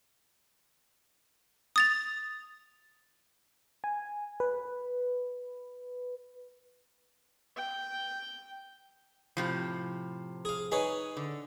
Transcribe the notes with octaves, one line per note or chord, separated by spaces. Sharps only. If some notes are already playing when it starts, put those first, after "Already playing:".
D#6 A6 F7
G#5
B4
G5
A2 C3 F3
G#4 F5
D#4 G#4 B4 C#5
D3